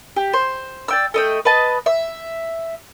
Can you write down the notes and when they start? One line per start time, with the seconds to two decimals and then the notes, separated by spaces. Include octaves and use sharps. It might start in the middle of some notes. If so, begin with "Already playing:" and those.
0.16 G4
0.33 C5
0.88 D5 G5 E6
1.14 A3 D#5 G5
1.45 B4 D#5 A5
1.86 E5